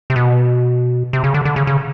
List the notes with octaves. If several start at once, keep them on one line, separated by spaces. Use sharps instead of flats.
C3
B2
C3
C#3
D3
D3
C#3
C#3